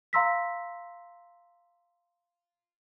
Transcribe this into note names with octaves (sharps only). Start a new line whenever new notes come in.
F5 A#5 C6 E6 A#6 B6